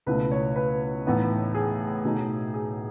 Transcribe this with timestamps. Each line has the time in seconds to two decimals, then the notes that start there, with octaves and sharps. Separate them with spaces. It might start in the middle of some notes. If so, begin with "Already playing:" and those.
0.06 C#2 B2 A3 E4 B4
0.31 C#5
0.56 B4
1.06 A2 E3 B3 D#4
1.55 G#4
2.04 B2 F#3 A3 D#4
2.54 G#4